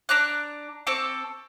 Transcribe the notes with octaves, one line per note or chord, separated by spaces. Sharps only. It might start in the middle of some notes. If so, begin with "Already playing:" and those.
D4 A#5 D6 F#6
C4 A4 C#6 D6